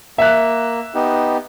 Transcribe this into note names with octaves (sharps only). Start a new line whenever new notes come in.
A#3 E5 F#6
B3 D#4 G4